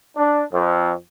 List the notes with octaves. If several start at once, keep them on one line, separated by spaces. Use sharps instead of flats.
D4
F2